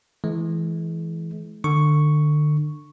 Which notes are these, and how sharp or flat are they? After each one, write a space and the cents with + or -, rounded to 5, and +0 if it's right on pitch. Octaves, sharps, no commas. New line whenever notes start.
E3 +0 G#3 +40
D3 +30 C#6 +0